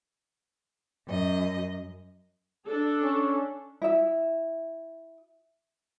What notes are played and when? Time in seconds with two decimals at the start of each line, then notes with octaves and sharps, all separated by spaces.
1.08 F#2 D#5
2.66 D4 A4
3.03 C#4
3.82 E4 E5